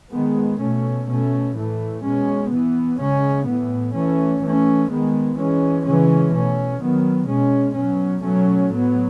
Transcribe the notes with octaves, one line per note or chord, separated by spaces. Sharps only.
D#3 G#3 B3
B2 A3 C#4
B2 A3 C#4
A2 E3 A3
B2 G#3 C#4
E3 B3
C#3 G#3 C#4
A2 E3 B3
E3 A3 C#4
E3 A3 C#4
D#3 G#3 B3
E3 G#3 C#4
C#3 E3 G#3 C#4
B2 A3 C#4
D#3 F#3 B3
B2 G#3 C#4
B2 F#3 C#4
B2 F#3 A3 C#4
A2 F#3 B3